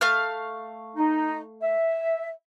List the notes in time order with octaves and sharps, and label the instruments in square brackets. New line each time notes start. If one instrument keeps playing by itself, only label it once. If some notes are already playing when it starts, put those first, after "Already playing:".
[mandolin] A3 F5 F6
[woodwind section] D#4
E5